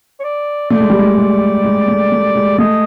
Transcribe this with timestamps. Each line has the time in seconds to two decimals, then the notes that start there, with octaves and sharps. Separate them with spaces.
0.19 C#5
0.23 D5
0.70 A3 D5
0.80 G#3
0.90 G3
0.99 G#3
1.17 G#3
1.64 G#3
1.88 A3
2.12 A3
2.35 G#3
2.58 A3 D#5